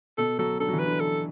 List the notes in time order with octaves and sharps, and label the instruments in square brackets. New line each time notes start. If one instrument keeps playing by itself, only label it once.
[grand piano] B2 [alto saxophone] A4
[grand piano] F#3 [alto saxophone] A4
[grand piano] D3 [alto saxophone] A4
[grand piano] F#3
E3
[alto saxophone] B4
[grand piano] D3
[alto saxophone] A4